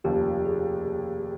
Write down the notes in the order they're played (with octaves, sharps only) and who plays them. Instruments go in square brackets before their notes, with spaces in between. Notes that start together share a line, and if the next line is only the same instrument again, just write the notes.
[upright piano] F1 D#2 C#3 F3 [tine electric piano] G4
[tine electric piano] G#4